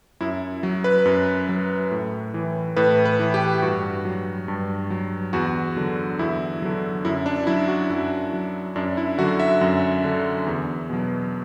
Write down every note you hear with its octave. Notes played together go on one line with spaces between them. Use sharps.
F#2 E4
F#3
B4
F#2
F#3
A2
E3
A2 B4
B4
E3
G4
G2 F#4
F#3
G2
F#3
E2 F#4
D3 F#3
E2 E4
D3 F#3
F#2 E4
D4
F#3 E4
F#4
F#2 E4
F#3
F#2 D4
E4
D3 F#3 F#4
E5
F#2
D3 F#3
E2
B2 F#3